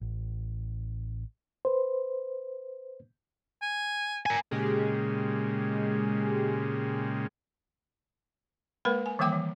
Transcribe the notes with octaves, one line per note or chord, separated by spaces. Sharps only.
A1
B4 C5
G#5
A#4 G#5
A#2 C#3 G#3 G4 G#4
G#3 A#3 A#4 B4 B5
G#5
D#3 E3 G3 A#3 G5 D6
E3